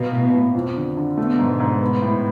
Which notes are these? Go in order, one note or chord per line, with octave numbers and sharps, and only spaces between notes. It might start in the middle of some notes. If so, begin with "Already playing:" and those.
Already playing: B2 A#3
A2
A2
F2
D3
D3
B2 A3
G#2
G#2
B3
A2